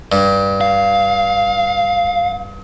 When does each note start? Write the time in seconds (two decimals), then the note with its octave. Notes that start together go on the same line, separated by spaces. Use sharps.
0.12 G2
0.61 F5